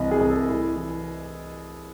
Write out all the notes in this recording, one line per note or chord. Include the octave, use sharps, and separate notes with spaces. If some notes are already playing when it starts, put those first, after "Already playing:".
Already playing: C2 C3 E3 D#5
G#4
C2
A4
C2 E4
E3